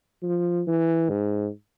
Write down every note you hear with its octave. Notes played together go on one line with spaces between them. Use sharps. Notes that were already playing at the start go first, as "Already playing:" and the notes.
F3
E3
G#2